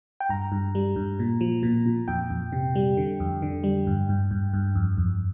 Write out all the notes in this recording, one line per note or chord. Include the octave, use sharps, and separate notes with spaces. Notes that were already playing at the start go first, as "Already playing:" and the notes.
G5
G2 A#5
G2
G3
G2
A#2
F3
A#2
A#2
F2 G5
F2
C3
G3
D3
F2
D3
G3
G2
G2
G2
G2
F2
F2